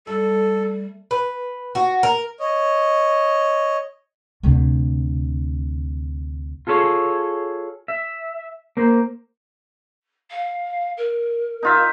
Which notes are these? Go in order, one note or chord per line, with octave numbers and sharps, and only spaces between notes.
G3 A3 A4
B4
F#4
A#4
C#5 D#5
D2 C3
F4 G#4 A4 C#5
E5
A#3 C5
F5
A#4
D#4 F4 E5